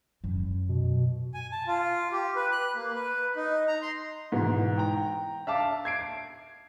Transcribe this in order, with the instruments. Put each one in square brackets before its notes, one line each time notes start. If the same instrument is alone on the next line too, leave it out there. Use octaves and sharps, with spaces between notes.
[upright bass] F#2
[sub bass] B2
[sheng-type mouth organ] G#5
A5
F4
G4
B4
F#6
A#3
B4
D#4
A#5
C6
[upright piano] G#2 B2 E3
G5 A#5
E5 F5 A5 D6 E6
G#6 C7 D7